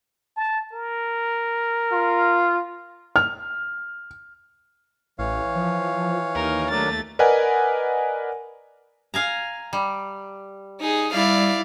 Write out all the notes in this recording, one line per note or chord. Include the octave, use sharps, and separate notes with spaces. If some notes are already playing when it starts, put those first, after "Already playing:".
A5
A#4
F4
F6
A1 E3 C#5 F5
F3
D#2 D#4 A#4
F#3 A3 D4 A#4 A6
A#4 B4 D5 D#5 F#5 G#5
F5 G#5 A#5
G3
D#4 G#4
G3 E4 D5 F5